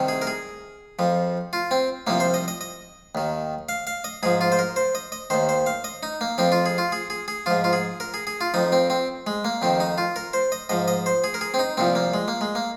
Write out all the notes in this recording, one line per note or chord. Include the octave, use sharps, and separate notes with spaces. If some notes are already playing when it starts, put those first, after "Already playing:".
Already playing: C2 C3 D#3
G#4
A#4
G#4
F2 F3
F4
C4
C2 C3 F3 A#3
C5
D#5
D#5
D#5
D#2 D#3
F5
F5
D#5
G#2 F3 G#4
F4
C5
A#4
C5
D#5
D#5
D#2 D#3 C5
C5
F5
D#5
D#4
A#3
F2 F3 C4
F4
G#4
F4
G#4
G#4
G#4
G#2 F3 F4
F4
G#4
A#4
G#4
G#4
F4
F2 F3 D#4
C4
C4
G#3
A#3
F2 D#3 C4
D#4
F4
A#4
C5
D#5
G#2 F3 D#5
D#5
C5
G#4
A#4
G#4
C4
D#4
C2 A#2 F3 C4
A#3
G#3
A#3
G#3
A#3